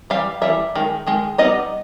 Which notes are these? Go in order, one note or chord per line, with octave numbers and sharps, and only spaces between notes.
E3 G3 F5
E3 G3 E5
D#3 G#3
D#3 G#3
G3 B3 D#4 D#5